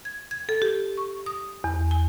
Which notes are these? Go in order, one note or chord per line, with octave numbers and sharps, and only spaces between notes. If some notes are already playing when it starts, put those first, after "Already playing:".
G#6
G#6
A4
G4
C#6
D#6
E2
G#5